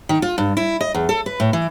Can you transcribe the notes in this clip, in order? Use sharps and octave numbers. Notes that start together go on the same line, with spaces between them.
D#3
F4
G2
E4
D#5
E2
A4
B4
A2
E3